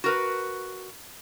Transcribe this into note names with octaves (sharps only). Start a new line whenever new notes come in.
F#4 A#4 B4